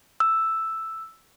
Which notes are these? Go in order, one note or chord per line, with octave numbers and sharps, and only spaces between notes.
E6